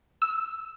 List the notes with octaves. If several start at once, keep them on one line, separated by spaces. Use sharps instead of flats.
E6